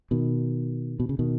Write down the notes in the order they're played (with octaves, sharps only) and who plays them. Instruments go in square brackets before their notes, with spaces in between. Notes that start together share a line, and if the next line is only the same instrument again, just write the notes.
[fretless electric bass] B2 D#3
B2
C#3
B2 D#3